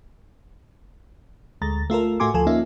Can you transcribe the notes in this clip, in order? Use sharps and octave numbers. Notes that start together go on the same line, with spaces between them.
D2 G#3 A#5 A6
A3 F4 A4 A#4
A2 A3 F#4 G#5 C6 D6
D2 F3 F4 A4 G#5
A#3 C#4 D#4 F4 E5